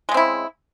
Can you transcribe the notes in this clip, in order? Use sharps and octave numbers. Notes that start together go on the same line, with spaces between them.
C#3 G#3 C4 E4